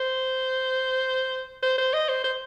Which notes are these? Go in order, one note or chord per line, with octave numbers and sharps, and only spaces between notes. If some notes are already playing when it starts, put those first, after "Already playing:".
Already playing: C5
C5
C5
D#5
C5
C5